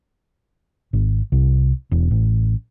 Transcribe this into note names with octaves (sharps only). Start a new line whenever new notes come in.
G#1
C2
E1
A1